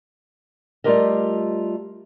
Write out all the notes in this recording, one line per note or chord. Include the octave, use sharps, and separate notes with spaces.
G3 A3 F4 G4 A#4 D#5